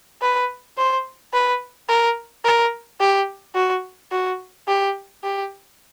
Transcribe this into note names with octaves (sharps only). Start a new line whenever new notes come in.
B4
C5
B4
A#4
A#4
G4
F#4
F#4
G4
G4